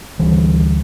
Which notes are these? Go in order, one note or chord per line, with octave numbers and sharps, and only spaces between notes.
D2 E3 G3